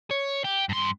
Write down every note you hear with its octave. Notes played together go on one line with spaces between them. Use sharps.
C#5
G4
G2 C6